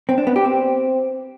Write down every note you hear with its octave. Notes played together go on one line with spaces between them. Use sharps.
C4
D4
B3
G4
C4